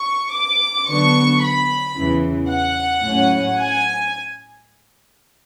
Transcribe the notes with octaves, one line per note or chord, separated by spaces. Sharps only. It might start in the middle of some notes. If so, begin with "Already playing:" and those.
Already playing: C#6
D6
D3 F#3 B3 D4 C#6
B5
E2 C#3 E3
F#5
A2 F#3 C#4
G#5